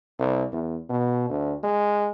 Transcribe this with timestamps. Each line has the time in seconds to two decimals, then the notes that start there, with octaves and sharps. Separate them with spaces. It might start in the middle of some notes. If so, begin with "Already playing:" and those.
0.19 C2
0.52 E2
0.90 B2
1.30 D2
1.63 G#3